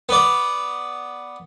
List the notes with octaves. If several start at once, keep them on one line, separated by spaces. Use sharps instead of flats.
B3 D5